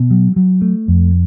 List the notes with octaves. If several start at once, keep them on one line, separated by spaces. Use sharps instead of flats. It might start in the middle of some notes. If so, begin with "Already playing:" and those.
Already playing: B2
F#3
F#3
A3
F2